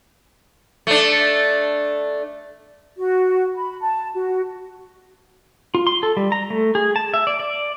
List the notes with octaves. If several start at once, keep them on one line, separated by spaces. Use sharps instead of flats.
A3 D4
F#4
B5
A5
F#4
F4
C6
A4
G3
A#5
A3
G#4
A5
E5
D5
D5